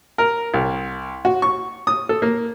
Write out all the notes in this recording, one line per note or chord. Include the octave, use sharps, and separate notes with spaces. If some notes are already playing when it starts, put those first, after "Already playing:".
A#4
C2
F#4
C#6
D#6
A4
A#3